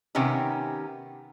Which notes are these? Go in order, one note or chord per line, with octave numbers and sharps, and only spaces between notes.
C3 D#3 B3 C#4 G4